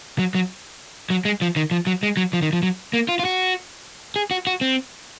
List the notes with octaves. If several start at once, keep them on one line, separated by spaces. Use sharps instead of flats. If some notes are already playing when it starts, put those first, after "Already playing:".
F#3
F#3
F#3
G#3
F3
D#3
F3
F#3
G#3
F#3
F3
D#3
F3
F#3
A#3
F4
F4
F#4
G#4
F#4
F#4
C4